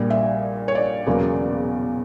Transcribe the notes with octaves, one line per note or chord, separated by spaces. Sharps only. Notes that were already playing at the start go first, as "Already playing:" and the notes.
Already playing: A#1 A#2 G3
E5
C#5
D5
E1 E2 C#3 F#3 A#3